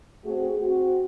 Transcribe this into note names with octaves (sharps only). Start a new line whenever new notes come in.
A3 C4 F#4 G#4
C4 F#4